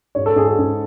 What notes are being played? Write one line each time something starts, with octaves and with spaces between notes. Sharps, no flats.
G#2 C#5
A4
G#2 G#4
G#4
G#2 G#4